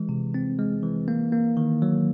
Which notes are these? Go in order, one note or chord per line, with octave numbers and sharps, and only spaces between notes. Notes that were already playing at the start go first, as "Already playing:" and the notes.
Already playing: E3 G#3
C3
C4
G#3
E3
A#3
A#3
D#3
F#3